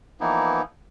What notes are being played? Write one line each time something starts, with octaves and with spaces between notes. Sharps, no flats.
E3 F3 A#3 B3 D#4 E4